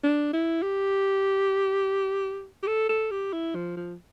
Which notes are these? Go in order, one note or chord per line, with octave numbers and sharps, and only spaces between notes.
D4
E4
G4
G4
A4
A4
G4
E4
F3
F3